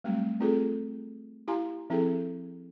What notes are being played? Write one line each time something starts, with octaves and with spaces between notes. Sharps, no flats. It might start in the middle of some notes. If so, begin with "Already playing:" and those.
F#3 G3 A3 C4 F#4
A3 C4 F4 G#4 A4
E4 G4 F5 G#5 A#5 C6
F3 C4 E4 G#4 A4 G5